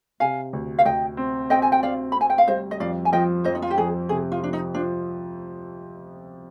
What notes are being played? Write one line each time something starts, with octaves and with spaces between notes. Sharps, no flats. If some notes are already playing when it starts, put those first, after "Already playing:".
C3 F5 G#5
D2
F5
D2 D#5 G5
C4
C4 D#5 G5
G#5
G5
C4 D5 F5
C4 B5
G#5
G5
F5
G3 C5 D#5
D#5
F2 D5 F5
G#5
F3 D#5 G5
F2 C5 D#5
D#4
F4
G4
F2 G#4
C3 G#4
F4
F3 D4
D#4
F3 D4